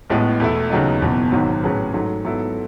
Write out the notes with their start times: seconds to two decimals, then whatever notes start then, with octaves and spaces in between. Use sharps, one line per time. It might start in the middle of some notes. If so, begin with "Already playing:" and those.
0.10 A1 A2 G#3 B3
0.40 E2 B2 A3 E4
0.70 D#2 C#3 F#3 B3 D#4
1.02 F#1 E2 B2
1.32 G#1 G#2 D#3 F#3
1.62 A2 F#3 C#4 G#4 B4
1.93 G#2 F#3 A3
2.24 G#2 F#3 B3 E4 A4